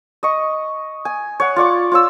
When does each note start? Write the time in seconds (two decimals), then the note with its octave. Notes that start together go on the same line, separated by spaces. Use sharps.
0.23 D#5 C#6
1.05 G#5
1.40 C#5 F#5
1.56 F4 D5 C#6 D6
1.92 F4 C#5 E6